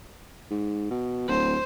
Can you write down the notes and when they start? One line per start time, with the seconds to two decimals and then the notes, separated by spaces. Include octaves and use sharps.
0.50 G#2
0.91 B2
1.28 D1 C5